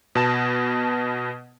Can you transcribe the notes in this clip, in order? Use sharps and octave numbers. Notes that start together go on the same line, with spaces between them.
B2 B3 A5 E7